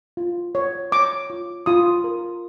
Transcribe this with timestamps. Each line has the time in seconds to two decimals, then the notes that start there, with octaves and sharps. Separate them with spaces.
0.17 F4
0.55 C#5
0.92 C#5 D6
1.30 F4
1.66 F4 D#6
2.04 A#4